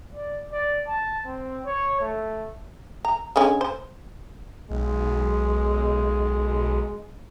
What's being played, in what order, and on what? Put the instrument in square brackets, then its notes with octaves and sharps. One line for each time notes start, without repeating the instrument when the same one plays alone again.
[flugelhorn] D5
D5
A5
C4
C#5
A3
[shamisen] A#5
D3 G#3 C#4
C5
[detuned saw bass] B1 [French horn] G#3